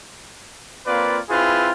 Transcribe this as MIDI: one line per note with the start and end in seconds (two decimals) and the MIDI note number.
0.87 1.19 58
0.87 1.19 60
0.87 1.19 65
0.87 1.19 71
0.87 1.19 74
1.29 1.71 60
1.29 1.71 64
1.29 1.71 65
1.29 1.71 68
1.29 1.71 71